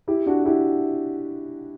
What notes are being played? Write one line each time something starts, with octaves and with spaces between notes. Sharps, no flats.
E4 G4
D4 F#4
E4 G4